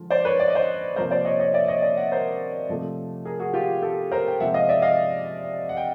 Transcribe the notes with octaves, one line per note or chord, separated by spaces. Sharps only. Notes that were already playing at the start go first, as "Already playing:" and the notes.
Already playing: D3 F3 G#3
C5 D5
B4 C#5
D5
D#5
C5 D5
C3 F3 A#3 A#4 C5
C5 D5
C#5 D#5
C#5 D#5
D5 E5
C#5 D#5
D5 E5
E5 F#5
A#4 C5
C3 F3 A3
G#4 A#4
F#4 G#4
F4 G4
G4 A4
A#4 C5
G5
C3 F3 G#3 C4 E5 F#5
D#5 F5
D5 E5
D#5 F5
F#5
G5